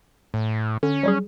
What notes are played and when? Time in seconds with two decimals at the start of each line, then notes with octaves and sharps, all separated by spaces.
0.34 A2
0.83 D3 C#4
1.03 F#3 G3 G#4